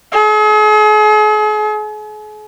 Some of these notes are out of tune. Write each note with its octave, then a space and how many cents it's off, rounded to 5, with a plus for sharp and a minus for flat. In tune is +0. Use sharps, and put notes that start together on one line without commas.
G#4 +40